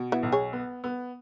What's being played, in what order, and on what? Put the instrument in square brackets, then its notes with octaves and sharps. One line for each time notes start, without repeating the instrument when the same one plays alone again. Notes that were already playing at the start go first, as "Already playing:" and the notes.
Already playing: [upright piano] B2
[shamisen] B3 E4
[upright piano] B1
[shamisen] G#4 C#5
[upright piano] B3
B3